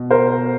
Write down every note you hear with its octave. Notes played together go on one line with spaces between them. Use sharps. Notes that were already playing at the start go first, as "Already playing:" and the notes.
Already playing: B2
A#4 C5